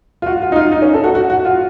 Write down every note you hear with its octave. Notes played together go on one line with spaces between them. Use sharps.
F4
F#4
F4
D#4
F4
D#4
C#4
A4
F#4
F#4
F#4
F4